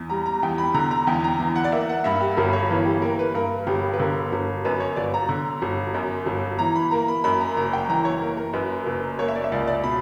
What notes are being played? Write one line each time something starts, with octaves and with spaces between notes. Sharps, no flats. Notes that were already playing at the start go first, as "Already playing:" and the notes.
Already playing: E2
G3 A#5
A#5
E2 G5
B5
D3 A#5
A#5
E2 G5
A#5
E3 A#5
F#5
D5
A#3 E5
F#5
G2 E5
G4
G1 A#4
C#5
E3 B4
G4
A#3 A#4
B4
G2 A#4
G1 G4
B4
D3 A#4
G1
F#2 B4
C#5
G1 D5
A#5
D3
G1
F#2
G1
E3 A#5
B5
A#3 A#5
B5
F#2 B5
A#5
F#1 A#5
G5
E3 A#5
C#5
A#3 A#4
A#4
F#2 B4
F#1
A#3 C#5
E5
D5
E5
C#2 D5
D5
B2 B5